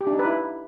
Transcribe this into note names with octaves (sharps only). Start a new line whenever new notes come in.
G4
D4
D#4
B4
E4